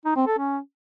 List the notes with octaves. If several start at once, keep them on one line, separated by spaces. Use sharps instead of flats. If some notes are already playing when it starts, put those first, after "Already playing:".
D#4
C4
A4
C#4